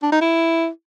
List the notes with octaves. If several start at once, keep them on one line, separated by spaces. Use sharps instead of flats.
D4
D#4
E4